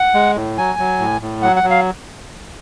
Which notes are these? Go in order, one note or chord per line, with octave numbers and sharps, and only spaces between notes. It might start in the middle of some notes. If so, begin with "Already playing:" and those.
Already playing: F#5
G#3
A2
F#3 G#5
F#3
A2
A2
F#3 F#5
F#5
F#3
F5